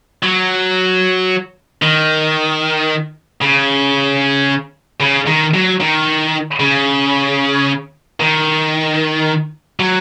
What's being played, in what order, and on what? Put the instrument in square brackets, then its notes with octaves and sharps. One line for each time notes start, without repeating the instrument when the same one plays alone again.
[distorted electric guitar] F#3
D#3
C#3
C#3
D#3
F#3
D#3
C#3
D#3
F#3